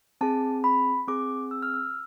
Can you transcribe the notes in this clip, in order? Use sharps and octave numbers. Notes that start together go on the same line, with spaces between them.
C4 G#4 A5
B5
C4 G#4 D6
E6
F6
E6